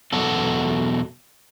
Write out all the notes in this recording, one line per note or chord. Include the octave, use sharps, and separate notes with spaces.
E2 B2 F#3 F#4 A4